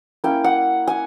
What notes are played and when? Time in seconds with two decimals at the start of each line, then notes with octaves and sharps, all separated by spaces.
0.24 A#3 C#4 E4 G5
0.44 F#5
0.87 G#5